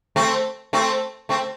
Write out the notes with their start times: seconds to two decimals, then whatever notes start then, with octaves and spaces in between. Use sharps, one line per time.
0.16 A3 C4
0.73 A3 C4
1.29 A3 C4